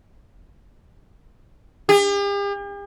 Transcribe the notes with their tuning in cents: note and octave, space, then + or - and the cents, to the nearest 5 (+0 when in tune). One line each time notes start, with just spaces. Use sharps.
G4 +45